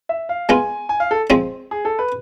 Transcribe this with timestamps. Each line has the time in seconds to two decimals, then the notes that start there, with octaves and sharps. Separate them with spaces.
0.09 E5
0.29 F5
0.49 G#3 B3 F4 G#5
0.89 G#5
1.00 F5
1.11 A4
1.30 F3 G#3 C4
1.71 G#4
1.85 A4
1.99 B4